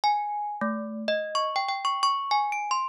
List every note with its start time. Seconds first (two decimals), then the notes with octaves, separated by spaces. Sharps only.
0.04 G#5
0.61 A3
1.08 D#5
1.35 C#6
1.56 G5
1.69 G5
1.85 C#6
2.03 C#6
2.31 G#5
2.52 D7
2.71 C6